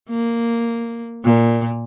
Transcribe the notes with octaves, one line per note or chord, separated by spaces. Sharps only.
A#3
A#2